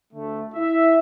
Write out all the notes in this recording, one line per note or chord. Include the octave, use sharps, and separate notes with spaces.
D2 D3 A3
E4 E5